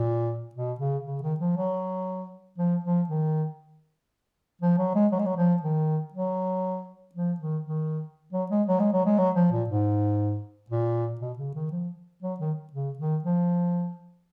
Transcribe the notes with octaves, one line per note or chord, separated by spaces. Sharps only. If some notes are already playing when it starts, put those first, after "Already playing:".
Already playing: A#2
B2
C#3
C#3
D#3
F3
F#3
F3
F3
D#3
F3
F#3
G#3
F#3
G#3
F#3
F3
D#3
F#3
F3
D#3
D#3
F#3
G#3
F#3
G#3
F#3
G#3
F#3
F3
A#2
G#2
A#2
B2
C#3
D#3
F3
F#3
D#3
C#3
D#3
F3